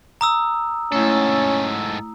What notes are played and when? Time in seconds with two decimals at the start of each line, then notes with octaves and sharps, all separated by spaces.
0.21 A#5 D#6 E6
0.92 G#2 A3 C#4 E4 A4